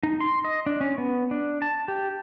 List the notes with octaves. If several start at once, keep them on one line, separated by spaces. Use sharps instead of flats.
D#4
C6
D#5
D4
C#4
B3
D4
A5
G4